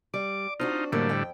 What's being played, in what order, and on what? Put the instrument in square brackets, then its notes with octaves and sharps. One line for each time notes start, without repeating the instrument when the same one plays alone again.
[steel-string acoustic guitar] G3 [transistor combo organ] D6
[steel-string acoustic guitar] C4 D4 F#4 [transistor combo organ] D#4 F4
[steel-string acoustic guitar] F2 F#3 A#3 [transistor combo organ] A2 D3 G3
[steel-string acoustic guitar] F2 G5